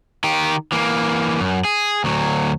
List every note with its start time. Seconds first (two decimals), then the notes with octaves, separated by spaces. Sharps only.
0.24 D#3 G4
0.72 E3 A#3
1.40 F#2
1.65 G#4
2.04 D2 F#3